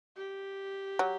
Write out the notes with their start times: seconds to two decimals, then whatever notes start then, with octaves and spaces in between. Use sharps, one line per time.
0.17 G4
0.99 F#3